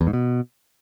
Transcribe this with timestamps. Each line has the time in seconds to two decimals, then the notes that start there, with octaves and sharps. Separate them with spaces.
0.01 E2
0.07 G#2
0.13 B2